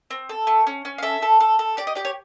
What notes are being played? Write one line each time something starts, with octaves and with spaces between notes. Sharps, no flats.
C4
A4
A3
C#4
C#4
F5
A4 E5
A4
A4
A4
G4 D5
D#5
G4 D5
C#5